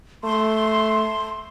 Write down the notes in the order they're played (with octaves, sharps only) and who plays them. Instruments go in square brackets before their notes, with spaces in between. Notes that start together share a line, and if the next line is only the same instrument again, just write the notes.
[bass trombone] A3 [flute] C6